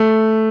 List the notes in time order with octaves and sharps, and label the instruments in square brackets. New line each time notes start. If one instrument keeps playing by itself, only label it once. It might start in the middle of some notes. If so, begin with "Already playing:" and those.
Already playing: [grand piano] A3